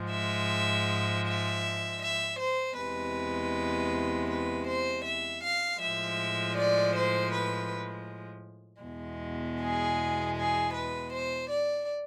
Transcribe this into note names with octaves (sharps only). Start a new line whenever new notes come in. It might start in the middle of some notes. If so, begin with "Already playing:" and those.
Already playing: G#2 F3 G#3
E5
E5
E5
C5
E2 C3 G#3 B4
B4
C5
E5
F5
A2 F3 G#3 E5
D5
C5
B4
E2 B2 G#3
G#4
G#4
B4
C5
D5